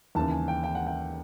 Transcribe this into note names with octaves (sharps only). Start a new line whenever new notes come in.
D#2 C#3 E3 A5
G#5
G5
G5
F#5
G5